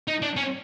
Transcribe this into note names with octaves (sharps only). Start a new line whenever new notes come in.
D#4
D4
C#4